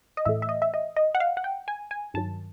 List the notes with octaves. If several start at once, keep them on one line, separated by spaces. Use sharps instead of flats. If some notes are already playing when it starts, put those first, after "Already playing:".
D#5
A2 E3 A3 E5
E5
D#5
E5
D#5
D#5
F#5
F5
F#5
G5
G#5
G#5
G2 D#3 F#3 A5